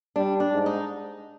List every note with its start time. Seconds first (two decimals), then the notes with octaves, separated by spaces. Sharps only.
0.16 G3 D4
0.40 D4
0.53 G#2
0.66 D#4